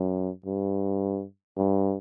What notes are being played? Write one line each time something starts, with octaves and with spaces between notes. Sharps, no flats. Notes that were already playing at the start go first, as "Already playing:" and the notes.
Already playing: F#2
G2
G2